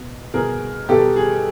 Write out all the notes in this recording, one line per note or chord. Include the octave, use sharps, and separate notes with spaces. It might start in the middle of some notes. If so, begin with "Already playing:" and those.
Already playing: B2
B2 G#4 A#4
B2 G4 A4
G#4